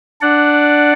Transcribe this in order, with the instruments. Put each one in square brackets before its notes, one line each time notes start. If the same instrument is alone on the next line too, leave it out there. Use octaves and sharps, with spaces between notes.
[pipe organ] D4 D5 F#5